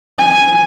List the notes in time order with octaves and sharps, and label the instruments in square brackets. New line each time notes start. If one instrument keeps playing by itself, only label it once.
[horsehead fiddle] G#5